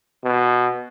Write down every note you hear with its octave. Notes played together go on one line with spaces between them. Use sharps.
B2